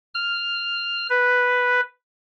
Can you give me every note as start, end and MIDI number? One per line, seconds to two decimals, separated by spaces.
0.15 1.07 89
1.10 1.81 71